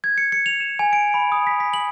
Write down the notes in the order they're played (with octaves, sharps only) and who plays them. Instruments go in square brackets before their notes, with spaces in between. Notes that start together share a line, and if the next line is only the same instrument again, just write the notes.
[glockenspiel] G#6
C#7
C#7
F7
E7
G#5
D7
B5
D#6
B6
B6
F#7